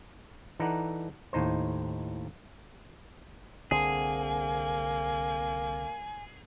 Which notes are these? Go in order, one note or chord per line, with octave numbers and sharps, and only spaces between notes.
E3 D#4 A4 D5 F#5 A#5
D#2 A2 D#4 C5
C2 D3 A#3 C4 G#4 G#5